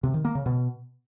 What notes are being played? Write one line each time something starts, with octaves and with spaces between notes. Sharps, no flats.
C3
D#3
A#3
C#3
B2